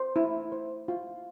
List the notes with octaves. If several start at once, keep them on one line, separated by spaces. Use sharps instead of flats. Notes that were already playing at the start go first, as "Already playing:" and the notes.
Already playing: C5
E4
C5
F4